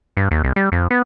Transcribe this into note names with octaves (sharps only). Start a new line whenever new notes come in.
G2
D#2
C2
G3
F2
B3